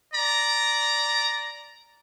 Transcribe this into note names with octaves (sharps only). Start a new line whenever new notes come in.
D5 A#5